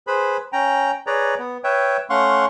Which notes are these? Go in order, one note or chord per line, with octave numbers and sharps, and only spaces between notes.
G#4 B4 C5 B5
C#4 G5 A#5
G#4 B4 C#5 D5 A#5
B3
B4 C#5 E5 G5
A3 C#4 F5 F#5 C6 C#6